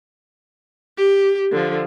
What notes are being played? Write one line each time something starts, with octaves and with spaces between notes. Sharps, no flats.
G4
D3 F3